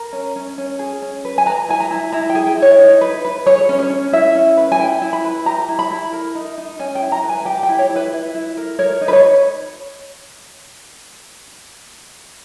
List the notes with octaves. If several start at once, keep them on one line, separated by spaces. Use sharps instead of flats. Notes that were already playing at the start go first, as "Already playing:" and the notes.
Already playing: A#4 A#5
C#4
C#4
C#4
G#4
C#4
B4
G#5
B4 A#5
E4 G#5
A#5
E4
E4 A#5
G5
G#4
G5
E4
C#5
D#4
B4
B4
G#4 C#5
C#4
C#5
C#4
E4 E5
C#4
B4
G#5
E4 G5
E4
B5
B4
G4 A#5
E4
B5
E4
A#4
D#4
D#4
C#4 G#5
G5
E4
A#5
B4
G#5
G4 G5
G5
E4
C#5
E4
B4
E4
E4
A#4
A#4 C#5
D#4
B4
C#5